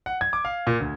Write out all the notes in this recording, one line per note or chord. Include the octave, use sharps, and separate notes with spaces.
F#5
G#6
D6
F5
A#2
D2